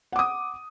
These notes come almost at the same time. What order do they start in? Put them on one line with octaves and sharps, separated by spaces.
F#5 D6 D#6